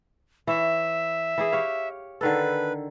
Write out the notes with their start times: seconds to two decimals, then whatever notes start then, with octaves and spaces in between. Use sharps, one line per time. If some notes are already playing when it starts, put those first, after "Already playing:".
0.47 E3 C#5 E5
1.38 E3 E4 G#4
1.52 G4 C#5 F5
2.21 D3 D#3 A4 B4